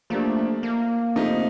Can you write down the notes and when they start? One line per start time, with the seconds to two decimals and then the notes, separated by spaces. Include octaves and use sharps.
0.10 F3 A3 A#3 D4 G4
0.63 A#3
1.16 C3 F3 A3 D#4